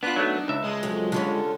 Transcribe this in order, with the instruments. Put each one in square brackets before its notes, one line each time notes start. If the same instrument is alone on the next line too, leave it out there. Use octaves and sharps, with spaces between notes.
[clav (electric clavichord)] B3 F4 [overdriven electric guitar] D4 [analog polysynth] B5 D6 F#6
[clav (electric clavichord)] F#3 A3 B3 [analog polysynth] D#4
[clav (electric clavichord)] C#2 E5
[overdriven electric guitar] G#3 [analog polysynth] A5 C6 D#6
[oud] F2 [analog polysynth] F#3
[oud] D3 G3 C#4 [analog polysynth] F4